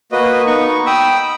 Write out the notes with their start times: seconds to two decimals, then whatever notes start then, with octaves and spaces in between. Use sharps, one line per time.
0.12 A#3 F#4 B4 D#5
0.47 B3 D#4 C#6
0.86 G5 B5 D#6 E6